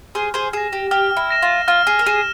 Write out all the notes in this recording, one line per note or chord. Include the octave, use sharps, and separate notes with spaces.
G#4 C5 F6
G#4 C5
G#4 A#6 E7
G4
G4 F6
E4
A#6 E7
F4
F4 F6
G#4
A#4
G#4 A#6 E7